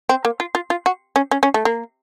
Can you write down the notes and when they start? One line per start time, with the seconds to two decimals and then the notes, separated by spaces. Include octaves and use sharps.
0.09 C4
0.25 A#3
0.40 F4
0.55 F4
0.70 F4
0.86 F#4
1.16 C#4
1.31 C#4
1.43 C#4
1.54 A3
1.65 A#3